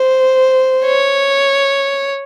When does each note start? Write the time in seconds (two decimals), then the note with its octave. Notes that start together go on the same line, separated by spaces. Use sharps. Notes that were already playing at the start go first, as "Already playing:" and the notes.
Already playing: C5
0.84 C#5